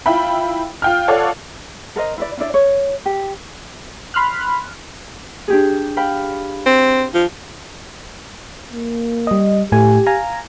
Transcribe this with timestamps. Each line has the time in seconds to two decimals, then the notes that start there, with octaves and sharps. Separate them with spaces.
0.06 E4 F4 E5 G5 B5
0.82 F4 G5 F6
1.08 F4 A4 C#5 D5 F5 F#5
1.96 A4 A#4 C5 D#5
2.18 E4 B4 D5
2.37 C#4 D4 E4 D5
2.54 C#5
3.06 G4
4.14 B5 C6 F6 F#6
5.48 D4 G4 G#4
5.97 F5 G5 B5
6.66 C4
7.14 F3
8.73 A#3
9.27 G3 D#5
9.72 A2 A3 G4 G#5
10.07 F5 G#5 A#5